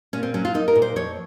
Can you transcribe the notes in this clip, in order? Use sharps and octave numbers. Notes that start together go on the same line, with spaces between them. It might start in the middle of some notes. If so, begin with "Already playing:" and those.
A#2 C#4
C4
F#3 C#4
F4
A#3 D#4
A#4
A#2
C5
F2 C#5